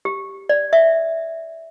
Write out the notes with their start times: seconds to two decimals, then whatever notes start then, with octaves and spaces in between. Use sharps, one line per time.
0.05 G4
0.49 D5
0.73 E5